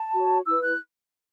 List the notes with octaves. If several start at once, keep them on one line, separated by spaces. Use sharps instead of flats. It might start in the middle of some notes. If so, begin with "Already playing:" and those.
Already playing: A5
F#4 C#5
E4 B4 E6
F#6